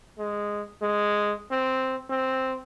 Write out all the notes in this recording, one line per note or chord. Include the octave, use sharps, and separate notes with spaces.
G#3
G#3
C4
C4